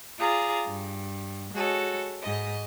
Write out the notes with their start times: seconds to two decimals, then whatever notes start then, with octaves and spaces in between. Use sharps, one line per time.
0.19 F4 G#4 D5 A#5
0.65 G2
1.53 G#3 F#4 A4 C#5
2.22 G#2 D#5